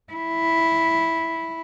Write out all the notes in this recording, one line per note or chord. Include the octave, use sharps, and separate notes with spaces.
E4